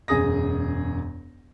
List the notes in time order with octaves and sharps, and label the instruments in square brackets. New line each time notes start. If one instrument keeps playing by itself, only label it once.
[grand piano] E1 F#2 G#4 D#6 A#6